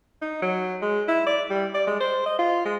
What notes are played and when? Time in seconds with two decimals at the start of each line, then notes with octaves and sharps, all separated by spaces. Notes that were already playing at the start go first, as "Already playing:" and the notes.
0.22 D#4
0.42 F#3
0.82 G#3
1.08 E4
1.26 D5
1.50 G3
1.74 D5
1.87 G#3
2.00 C5
2.26 D#5
2.39 F4
2.65 G#3